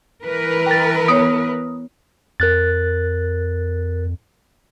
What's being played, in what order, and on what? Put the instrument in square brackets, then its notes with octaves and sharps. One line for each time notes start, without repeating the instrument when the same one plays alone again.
[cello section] E3 A#4 B4
[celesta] G5 A6
[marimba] B3 C#5 [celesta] D#6
[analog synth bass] F2 [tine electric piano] A#4 F#6 A6